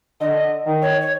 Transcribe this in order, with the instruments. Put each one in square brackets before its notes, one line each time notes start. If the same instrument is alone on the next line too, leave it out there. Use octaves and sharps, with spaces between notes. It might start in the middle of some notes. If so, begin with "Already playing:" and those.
[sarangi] D3 [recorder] D#5
[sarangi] D#3
[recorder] C#5
C#5